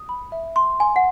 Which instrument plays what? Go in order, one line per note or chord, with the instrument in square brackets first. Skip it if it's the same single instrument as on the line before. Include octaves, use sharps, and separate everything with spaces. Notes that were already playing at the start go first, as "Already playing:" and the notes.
Already playing: [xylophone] D#6
B5
E5
C6
[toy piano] G#5 [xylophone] C6
[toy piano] F#5